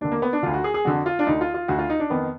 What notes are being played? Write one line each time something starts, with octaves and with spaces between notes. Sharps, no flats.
D#2 D3 D4
A#3
B3
D4
D2 D3 F4
F#4
G#4
G#4
F2 D3 F#4
F4
D4
D2 D3 D#4
F4
F4
D2 D3 F#4
F4
D#4
D4
F2 D#3 B3